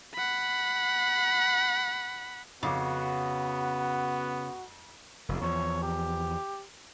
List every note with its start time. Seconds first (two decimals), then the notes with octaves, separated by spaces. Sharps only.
0.14 F#5 B5
2.63 F2 C#3 B3 F#4 D6
5.29 F1 D#2
5.41 E2 F3 C#5
5.82 G4